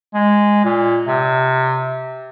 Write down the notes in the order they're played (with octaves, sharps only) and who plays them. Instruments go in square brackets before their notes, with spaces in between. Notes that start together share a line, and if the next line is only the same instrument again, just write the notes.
[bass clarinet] G#3
A#2
C3